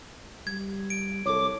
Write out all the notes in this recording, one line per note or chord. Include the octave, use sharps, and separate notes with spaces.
G3 G#6
D7
C2 A4 C#5 D6